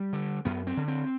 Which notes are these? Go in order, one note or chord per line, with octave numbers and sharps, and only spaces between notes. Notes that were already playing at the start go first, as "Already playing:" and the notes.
Already playing: G3
D3
F#2 B3
C4
D3
C4